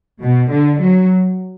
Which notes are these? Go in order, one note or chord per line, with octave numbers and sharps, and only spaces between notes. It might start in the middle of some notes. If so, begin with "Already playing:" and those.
B2
D3
F#3